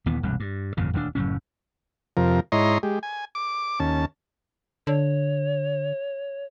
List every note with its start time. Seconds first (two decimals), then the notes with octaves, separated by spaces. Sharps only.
0.06 D#1 D#2 E3 B3
0.23 E1 C2 G2
0.40 G2
0.77 G1 F2 A#2 C#3
0.94 D#1 D2 F#3 D4
1.15 F#1 F#2 A2 C#4
2.17 F2 C3 F3 A#4
2.52 G#2 E4 C#5 D#5 A#5 C6
2.83 G#3 G4
3.03 G#5
3.35 D6
3.80 D#2 C#4 A5
4.87 D3 C#5